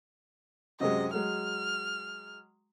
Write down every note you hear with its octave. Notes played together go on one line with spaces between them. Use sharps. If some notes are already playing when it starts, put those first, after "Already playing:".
F#2 C3 G#3 D#5
F#3 G#3 F6